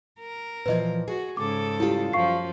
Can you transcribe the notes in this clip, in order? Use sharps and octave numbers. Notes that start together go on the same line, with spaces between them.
A#4
A#2 E3 F3 B4 D#5
F#4 G#4
G#2 C#3 A4 D6
G3 E4 F4 G4
F#2 F3 F5 C#6 C7